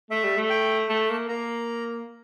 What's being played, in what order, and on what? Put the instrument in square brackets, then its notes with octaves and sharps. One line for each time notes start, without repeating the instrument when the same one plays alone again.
[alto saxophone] A3 [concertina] E5
[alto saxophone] G3
A3
[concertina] G5
[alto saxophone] A3 [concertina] A5
[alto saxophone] A#3
[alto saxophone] A#3 [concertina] A#5